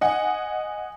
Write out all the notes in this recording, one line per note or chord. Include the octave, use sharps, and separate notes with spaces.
D#5 F#5 G#5